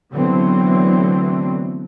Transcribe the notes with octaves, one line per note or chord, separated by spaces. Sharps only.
D3 E3 F#3 A3 B3 C4